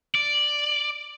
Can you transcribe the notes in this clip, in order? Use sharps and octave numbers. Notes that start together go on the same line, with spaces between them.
D5